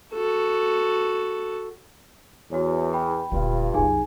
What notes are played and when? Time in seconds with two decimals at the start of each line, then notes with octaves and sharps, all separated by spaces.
0.13 F#4 A4
2.52 E2 F#4 C#5
2.93 G5 B5
3.31 D#1 D2 G2 F4
3.74 C2 F#2 D#4 G#4 G#5